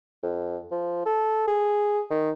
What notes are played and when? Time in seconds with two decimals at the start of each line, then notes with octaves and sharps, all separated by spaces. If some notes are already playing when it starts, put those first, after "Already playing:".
0.23 F2
0.72 F3
1.06 A4
1.48 G#4
2.11 D#3